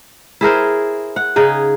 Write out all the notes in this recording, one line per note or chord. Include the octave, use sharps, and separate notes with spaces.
E4 G#4 A#4 C5
F#5
C#3 D#4 G#4